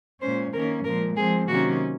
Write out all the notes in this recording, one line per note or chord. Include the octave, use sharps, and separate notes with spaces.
A#2 G#3 C#4 C5
D#3 A#3 C#4 A#4
A#2 F3 G#3 A#4
F3 G#3 C4 G#4
C3 D#3 F#3 A#3 C#4 F#4